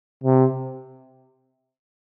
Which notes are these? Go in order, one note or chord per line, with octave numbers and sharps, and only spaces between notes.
C3